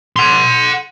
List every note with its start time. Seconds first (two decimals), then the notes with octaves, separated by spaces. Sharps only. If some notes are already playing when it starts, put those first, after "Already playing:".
0.16 F#5 C6